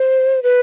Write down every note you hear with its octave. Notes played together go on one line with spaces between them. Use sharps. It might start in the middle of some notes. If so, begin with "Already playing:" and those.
Already playing: C5
B4